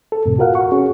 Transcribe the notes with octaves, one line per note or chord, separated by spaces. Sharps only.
A4
F2 A2 C3
F4 F#4 A#4 F5 F#5
F#5 C#6
C#4 F#4 G#4